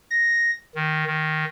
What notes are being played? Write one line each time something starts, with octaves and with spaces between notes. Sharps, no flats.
A#6
D#3
D#3